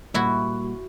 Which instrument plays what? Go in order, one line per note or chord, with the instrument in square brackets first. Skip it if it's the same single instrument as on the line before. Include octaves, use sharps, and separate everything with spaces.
[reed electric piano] A#2 G3 A#3 [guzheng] E4 F#4